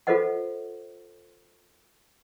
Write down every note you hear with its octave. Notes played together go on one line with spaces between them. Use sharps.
F4 A4 B4 C5 D#5 F#5